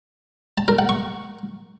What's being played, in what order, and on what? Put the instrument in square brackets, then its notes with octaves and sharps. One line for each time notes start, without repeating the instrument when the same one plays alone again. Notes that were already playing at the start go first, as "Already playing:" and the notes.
[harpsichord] A5
A#4
F#5
C#6